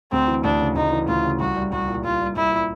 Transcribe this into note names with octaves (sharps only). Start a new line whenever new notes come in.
D2 C4
E3
D2 D4
C#3
D2 D#4
E3
D2 F4
C#3
C2 F#4
G3
C2 F#4
A#2
C2 F4
G3
C2 E4
A#2